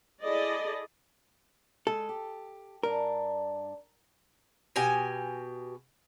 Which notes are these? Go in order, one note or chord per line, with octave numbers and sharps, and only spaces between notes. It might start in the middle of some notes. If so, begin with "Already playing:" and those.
E4 G#4 A4 D5 D#5
G#3 A4
G4
G2 D4 A#4
B2 G4 G#5